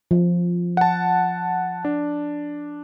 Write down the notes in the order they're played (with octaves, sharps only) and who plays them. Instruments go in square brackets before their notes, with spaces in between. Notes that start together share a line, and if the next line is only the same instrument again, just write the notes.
[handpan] F3
[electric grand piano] F#5 A5
D4